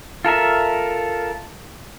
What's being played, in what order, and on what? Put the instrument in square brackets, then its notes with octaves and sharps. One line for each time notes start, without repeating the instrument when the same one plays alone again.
[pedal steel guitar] F4 A4 A#4 E5